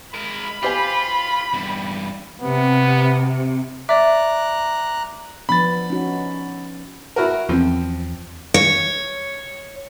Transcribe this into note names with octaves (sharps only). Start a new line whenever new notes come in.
G#3 A#4 B5
F4 G4 C5 G#5
E2 G2
C3 B3
D5 E5 A#5 D6 F#6
F3 B3 D4 B5 A6
C#4 D#4 F#4
E4 F#4 A#4
E2 F3 C4
C#5